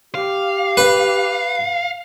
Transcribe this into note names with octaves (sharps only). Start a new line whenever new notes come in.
G4 F5
B4